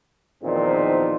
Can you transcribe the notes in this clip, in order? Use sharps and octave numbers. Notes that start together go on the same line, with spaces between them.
E2 A#2 D#3 F3 C4 D#4